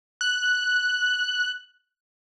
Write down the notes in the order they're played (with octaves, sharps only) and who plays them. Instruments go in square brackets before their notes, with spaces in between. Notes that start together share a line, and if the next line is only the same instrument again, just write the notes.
[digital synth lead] F#6